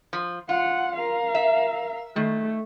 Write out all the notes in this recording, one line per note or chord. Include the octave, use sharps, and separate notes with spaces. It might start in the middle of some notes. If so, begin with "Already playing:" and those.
F3
F4 F#5
A#4 F5
E5
D#3 A3